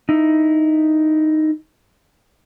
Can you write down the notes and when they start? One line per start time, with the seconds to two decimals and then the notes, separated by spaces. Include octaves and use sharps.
0.09 D#4 E4